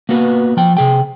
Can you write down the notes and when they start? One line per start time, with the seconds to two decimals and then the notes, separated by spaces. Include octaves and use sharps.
0.09 A#3 B3 F#4 B4
0.57 F3 G5
0.77 C3 G#4 G5